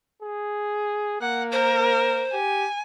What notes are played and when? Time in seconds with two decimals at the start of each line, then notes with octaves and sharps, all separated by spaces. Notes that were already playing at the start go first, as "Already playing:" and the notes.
0.23 G#4
1.21 A#3 F#5
1.52 A#4 C5
2.34 G4 G#5